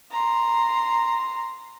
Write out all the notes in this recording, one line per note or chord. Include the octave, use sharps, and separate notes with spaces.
A#5 C6